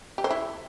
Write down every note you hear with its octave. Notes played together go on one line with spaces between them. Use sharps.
G4
C5
E4